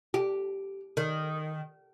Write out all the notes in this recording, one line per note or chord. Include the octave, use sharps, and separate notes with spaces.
G4
D#3